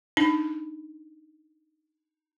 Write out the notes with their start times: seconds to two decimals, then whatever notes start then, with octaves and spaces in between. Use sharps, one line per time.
0.17 D4 D#4 B5